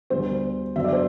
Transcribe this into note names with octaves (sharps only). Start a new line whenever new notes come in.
D2 D3 G3 B3 C5
F#2 D3 F#3 B3 E5
D5
C5